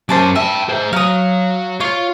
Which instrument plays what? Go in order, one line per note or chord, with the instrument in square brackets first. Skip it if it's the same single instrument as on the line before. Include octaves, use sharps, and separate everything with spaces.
[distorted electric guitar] F#2 C#4 [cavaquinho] C5 A5 D6
[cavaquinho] E5 [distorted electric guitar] G5 A5
[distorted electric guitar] G#3 C5
[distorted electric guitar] F#3 [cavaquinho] F5 D#6
[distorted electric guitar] F4 [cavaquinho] C#5